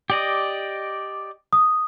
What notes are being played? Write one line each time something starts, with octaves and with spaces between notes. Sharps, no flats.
G4 D5 D#5
D#6